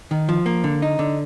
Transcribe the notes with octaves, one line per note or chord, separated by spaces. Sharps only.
D#3
F3
A#3
D3
D#4
D3